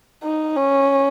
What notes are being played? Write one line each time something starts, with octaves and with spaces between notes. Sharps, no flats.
D#4
C#4